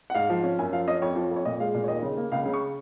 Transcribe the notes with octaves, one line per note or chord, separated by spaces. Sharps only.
F#5
G#2 F5
F3
C#4
F#2 G#5
F3 F5
C#4 D#5
F2 C#5
F3
F2
C#5
A#2 D#5
G#3 F5
A#2 F5
C#5
D#2 D#5
C#3
A#3
C#2 F5
C#3
C#6